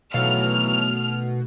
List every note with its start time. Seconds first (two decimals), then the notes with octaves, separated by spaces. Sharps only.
0.14 B2 D#3 E3 F#3 A3 F5 F6